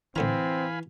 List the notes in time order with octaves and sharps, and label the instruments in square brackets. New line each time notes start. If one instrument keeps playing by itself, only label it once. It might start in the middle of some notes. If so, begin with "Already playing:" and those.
[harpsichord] A2 D3 A#5 [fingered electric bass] E3 [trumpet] C4 [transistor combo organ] F5 G#5 B5